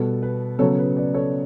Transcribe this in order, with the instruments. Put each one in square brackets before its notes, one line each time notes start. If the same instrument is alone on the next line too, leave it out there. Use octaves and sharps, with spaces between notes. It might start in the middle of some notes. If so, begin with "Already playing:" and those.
Already playing: [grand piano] B2 G3 B3 A4
B4
C#3 F#3 B3 A4 C#5
B4
B4 D5
A4 C#5